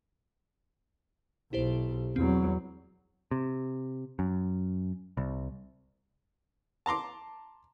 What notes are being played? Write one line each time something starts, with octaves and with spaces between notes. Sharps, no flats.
B1 E4 G4 C5
E2 F#3 C4
C3
F#2
C2
A5 A#5 C6 D6